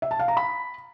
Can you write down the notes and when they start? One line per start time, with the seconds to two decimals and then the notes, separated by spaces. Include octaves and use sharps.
0.02 E5
0.11 A5
0.19 F5
0.28 A#5
0.37 B5